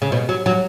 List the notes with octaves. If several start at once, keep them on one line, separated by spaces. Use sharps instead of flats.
C#3
B2
F#3
F#3